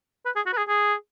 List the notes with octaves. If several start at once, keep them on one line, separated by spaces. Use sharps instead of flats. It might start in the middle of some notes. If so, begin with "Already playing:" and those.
B4
G#4
F#4
B4
G#4
G#4